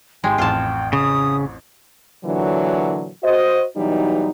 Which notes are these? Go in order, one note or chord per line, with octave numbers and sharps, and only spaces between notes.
G#1 G#3 G4 G5 C6
A1 F2 F4 A5
C#3 D#6
A#2 D3 E3 F#3
F#4 C5 D#5
B2 E3 F#3 G3 D#4